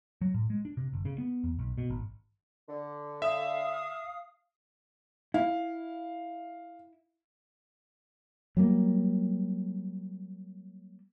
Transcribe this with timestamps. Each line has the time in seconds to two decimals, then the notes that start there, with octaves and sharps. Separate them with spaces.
0.21 F#3
0.34 A2
0.50 G#3
0.65 D4
0.77 C3
0.93 G1
1.05 C#3
1.18 B3
1.44 E2
1.59 B1
1.78 B2
1.90 G#1
2.69 D3
3.22 E5 F5 D#6
5.34 E4 F5
8.57 F#3 G3 A#3